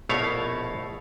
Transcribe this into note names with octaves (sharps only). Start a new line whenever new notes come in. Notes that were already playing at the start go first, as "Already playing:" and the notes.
A#1 B2 A3 E4 C#5 F5